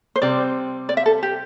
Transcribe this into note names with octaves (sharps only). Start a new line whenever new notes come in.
C5
C3 G3 C4 D5
D5
E5
A4
G4